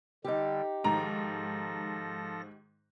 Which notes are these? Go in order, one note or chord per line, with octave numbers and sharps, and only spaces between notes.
D3 G3 D#4 G4
G#2 D#3 F3 A4 A#5 A#6